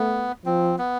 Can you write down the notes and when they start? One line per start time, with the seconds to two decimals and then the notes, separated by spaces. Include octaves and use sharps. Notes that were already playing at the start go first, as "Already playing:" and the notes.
Already playing: A3 B3
0.45 F3 C4
0.79 B3